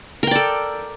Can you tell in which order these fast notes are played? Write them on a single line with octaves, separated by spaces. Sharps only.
A#4 G5 D5 A4